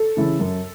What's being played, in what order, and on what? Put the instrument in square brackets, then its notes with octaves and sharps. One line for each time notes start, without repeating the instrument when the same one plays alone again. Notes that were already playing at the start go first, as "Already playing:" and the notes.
Already playing: [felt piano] A4
C#3 E3
F#2